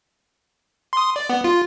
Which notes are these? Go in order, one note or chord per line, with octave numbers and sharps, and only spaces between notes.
C6 D#6
D5
B3
F4